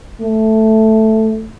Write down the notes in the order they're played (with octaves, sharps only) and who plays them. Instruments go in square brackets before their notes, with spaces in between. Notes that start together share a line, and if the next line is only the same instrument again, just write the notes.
[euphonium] A3